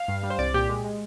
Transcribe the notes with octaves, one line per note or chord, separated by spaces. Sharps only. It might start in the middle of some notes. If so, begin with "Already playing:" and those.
Already playing: F5
G2
G3
C5
C2 D5
A#2 G4
G#3
G#3